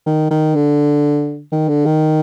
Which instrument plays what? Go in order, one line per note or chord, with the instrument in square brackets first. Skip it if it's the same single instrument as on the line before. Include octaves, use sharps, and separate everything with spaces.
[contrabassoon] D#3
D#3
D3
D#3
D3
D#3